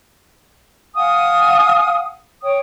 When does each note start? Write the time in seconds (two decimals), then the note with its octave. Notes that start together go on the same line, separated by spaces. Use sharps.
0.95 F5 F#5 G#5 D#6
2.43 C#5 G5 D#6